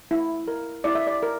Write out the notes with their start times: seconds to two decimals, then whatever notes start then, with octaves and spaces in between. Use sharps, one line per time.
0.11 E4
0.48 A#4
0.84 E4 D5
0.95 E5
1.07 D5
1.23 A#4